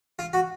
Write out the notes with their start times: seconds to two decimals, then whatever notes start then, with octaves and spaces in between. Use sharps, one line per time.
0.19 F4
0.33 F#4